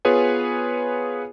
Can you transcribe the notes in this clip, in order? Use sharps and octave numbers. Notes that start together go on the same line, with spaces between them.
B3 F4 G#4 B4 C#5 G#5